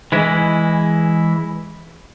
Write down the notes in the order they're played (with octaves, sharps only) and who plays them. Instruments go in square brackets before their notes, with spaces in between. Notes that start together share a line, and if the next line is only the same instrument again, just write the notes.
[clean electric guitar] E3 G#3 E4